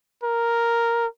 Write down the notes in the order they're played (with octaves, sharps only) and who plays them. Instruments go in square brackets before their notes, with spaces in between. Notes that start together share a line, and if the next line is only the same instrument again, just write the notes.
[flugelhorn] A#4